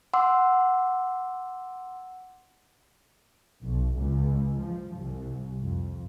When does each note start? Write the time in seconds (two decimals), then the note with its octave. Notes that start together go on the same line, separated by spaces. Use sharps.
0.14 F#5 C6 D6 E6
3.62 B1
3.98 C#2
4.63 F3
4.97 C2
5.60 F2